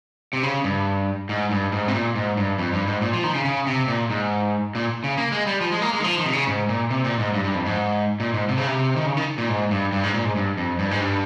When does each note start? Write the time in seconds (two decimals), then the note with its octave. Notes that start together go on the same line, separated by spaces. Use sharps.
0.33 C3
0.43 C#3
0.64 G2
1.29 G#2
1.51 G2
1.72 G#2
1.88 C3
1.94 A#2
2.16 G#2
2.37 G2
2.58 F2
2.73 G2
2.87 G#2
3.02 A#2
3.13 F3
3.24 D#3
3.35 C#3
3.45 C#3
3.67 C3
3.88 A#2
4.10 G#2
4.75 A#2
5.04 C#3
5.17 A#3
5.32 G#3
5.47 G3
5.61 F3
5.72 G#3
5.82 A#3
5.93 G#3
6.00 D#3
6.04 F3
6.19 D#3
6.26 C3
6.33 C#3
6.47 G#2
6.69 A#2
6.91 C3
7.05 A#2
7.19 G#2
7.34 G2
7.44 G2
7.55 F2
7.66 G#2
8.20 A#2
8.34 G#2
8.49 C3
8.58 C#3
8.67 C3
8.96 D#3
9.06 C#3
9.17 D#3
9.38 A#2
9.49 G#2
9.71 G2
9.92 G2
10.03 G#2
10.14 A#2
10.25 G#2
10.36 G2
10.57 F2
10.79 G2
10.91 G#2
11.01 G2